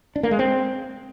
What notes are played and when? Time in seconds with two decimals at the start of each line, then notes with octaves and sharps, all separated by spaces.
0.16 D4
0.23 A#3
0.31 G#3
0.39 C4